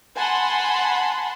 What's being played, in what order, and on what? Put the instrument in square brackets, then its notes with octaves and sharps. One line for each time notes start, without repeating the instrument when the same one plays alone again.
[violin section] F#5 G#5 A5 B5 C6